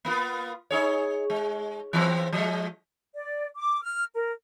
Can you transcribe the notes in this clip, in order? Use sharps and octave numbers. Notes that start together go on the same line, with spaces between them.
A#3 B3 F4
D#4 G#4 C#5
G#3
E3 B3 C4
F3 G#3
D5
D6
F6
A#4